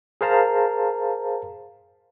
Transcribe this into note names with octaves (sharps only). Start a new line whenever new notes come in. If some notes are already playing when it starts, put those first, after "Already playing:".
G#4 A#4 C5 F5 A5 A#5